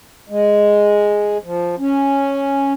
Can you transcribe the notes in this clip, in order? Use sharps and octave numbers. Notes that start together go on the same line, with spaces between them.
G#3
F3
C#4